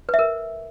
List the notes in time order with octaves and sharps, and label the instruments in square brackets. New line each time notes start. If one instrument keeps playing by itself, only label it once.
[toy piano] B4
E5
A#4